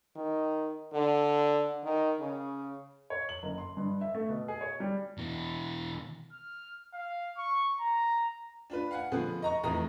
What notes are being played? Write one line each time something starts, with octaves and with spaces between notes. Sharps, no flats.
D#3
D3
D#3
C#3
C#5
F#7
F#1
C6
G2
E5
A3
B2
G#4
C#5
G3
B2 E3
F6
F5
C#6
A#5
D4 F4 B4
F5 F#5 G#5
B2 D3 F3 B3 G#4
D#5 A#5 C#6
F1 E2 A2 G#4 A#5 D#6